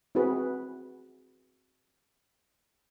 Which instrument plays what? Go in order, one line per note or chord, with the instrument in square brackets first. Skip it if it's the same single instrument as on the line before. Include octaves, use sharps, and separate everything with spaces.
[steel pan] C4 E4 F#4 G#4 B4